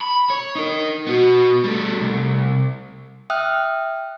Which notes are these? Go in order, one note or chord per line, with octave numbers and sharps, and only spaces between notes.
B5
C#5
D#4 A#4
B3 F#4
G3 A3
C2
E5 G5 D#6 F6 F#6